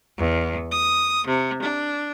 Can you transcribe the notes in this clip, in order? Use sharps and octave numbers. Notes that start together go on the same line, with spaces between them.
E2
D#6
C3
D4